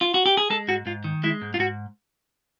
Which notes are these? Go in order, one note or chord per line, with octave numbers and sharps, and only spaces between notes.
F4
F#4
G4
G#4
G#3 A4
G#2 F#4
G#2 F4
D#3
G#3 E4
G#2
F4
G#2 F#4